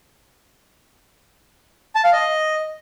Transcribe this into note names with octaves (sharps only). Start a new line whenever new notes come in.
A5
F5
D#5